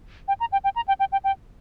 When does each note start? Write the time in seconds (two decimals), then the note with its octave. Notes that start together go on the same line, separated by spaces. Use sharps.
0.28 G5
0.40 A#5
0.52 G5
0.64 G5
0.76 A#5
0.88 G5
1.00 G5
1.12 G5
1.24 G5